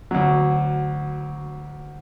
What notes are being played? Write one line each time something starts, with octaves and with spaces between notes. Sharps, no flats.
D2 F#3